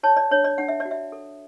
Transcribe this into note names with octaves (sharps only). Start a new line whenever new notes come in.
C#5 A5
D5
D4 C#5
D5
D4 F#5
E5
D5
F#4
E5
A4